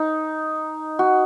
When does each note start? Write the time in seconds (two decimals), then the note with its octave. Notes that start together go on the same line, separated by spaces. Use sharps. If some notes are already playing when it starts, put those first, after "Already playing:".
Already playing: D#4
0.99 F#4